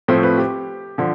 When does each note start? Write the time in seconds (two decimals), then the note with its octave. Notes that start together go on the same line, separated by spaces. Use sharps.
0.08 A2 F3 A3 C4 C5
0.23 B4
0.38 G4
0.98 D3 F3